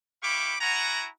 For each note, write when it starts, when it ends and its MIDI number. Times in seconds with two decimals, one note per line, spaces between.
0.22 0.55 64
0.22 0.55 67
0.22 0.55 77
0.22 0.55 83
0.22 0.55 85
0.22 0.55 86
0.60 1.07 64
0.60 1.07 66
0.60 1.07 78
0.60 1.07 80
0.60 1.07 82